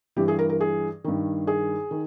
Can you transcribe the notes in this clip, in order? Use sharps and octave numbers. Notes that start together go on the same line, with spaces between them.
G2 E3 G4
G#4
A#4
A#4
G#4
G2 D#3
G#4
D#3